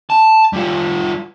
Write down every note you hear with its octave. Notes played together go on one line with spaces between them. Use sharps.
A5
G3 F4